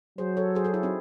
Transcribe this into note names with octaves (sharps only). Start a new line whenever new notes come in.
F#3 G#4 C5
A4 C#5
G#4 C5
F#4 A4
E4 G#4
C4 D#4